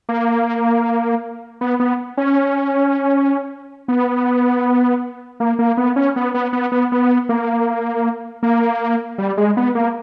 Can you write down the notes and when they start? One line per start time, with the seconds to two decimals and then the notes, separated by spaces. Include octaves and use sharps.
0.09 A#3
1.61 B3
1.80 B3
2.17 C#4
3.88 B3
5.40 A#3
5.59 A#3
5.77 B3
5.96 C#4
6.16 B3
6.34 B3
6.53 B3
6.72 B3
6.92 B3
7.29 A#3
8.43 A#3
9.18 G3
9.37 G#3
9.57 B3
9.75 A#3